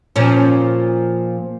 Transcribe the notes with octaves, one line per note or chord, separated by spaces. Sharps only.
A#2 F3 C#4